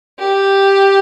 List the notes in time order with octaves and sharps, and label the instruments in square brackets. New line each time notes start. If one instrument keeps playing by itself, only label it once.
[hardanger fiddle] G4